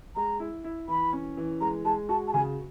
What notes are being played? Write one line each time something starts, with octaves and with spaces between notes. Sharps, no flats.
G#3 A#5
E4
E4
E3 B5
C#4
E3
G#3 A#5
G#3 A5
F#4 A5
A5
C#3 G#5